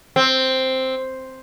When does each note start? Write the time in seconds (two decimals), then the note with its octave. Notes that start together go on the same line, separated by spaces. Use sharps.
0.16 C4